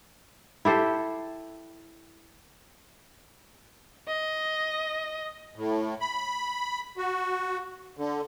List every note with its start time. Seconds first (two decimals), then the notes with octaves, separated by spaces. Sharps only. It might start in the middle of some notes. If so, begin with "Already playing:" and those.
0.65 E4 G4 A4 C5
4.08 D#5
5.56 A2
6.01 B5
6.97 F#4
7.97 D3